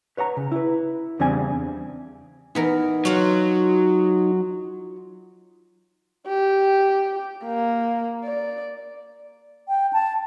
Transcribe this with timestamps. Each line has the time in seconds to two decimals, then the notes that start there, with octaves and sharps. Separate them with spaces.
0.17 B4 C#5 F#5 A#5
0.37 C#3
0.52 E4 B4
1.20 E2 C#3 G3 C4 D4 G#5
2.55 E3 B3 D#4 A#4
3.05 F#3 F4 F#4 C#5
6.28 G4
7.45 A#3
8.24 D5
9.68 G5
9.93 A5